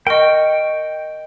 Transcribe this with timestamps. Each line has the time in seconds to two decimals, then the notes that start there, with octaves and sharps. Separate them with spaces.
0.07 A#4 D#5 G5 C#6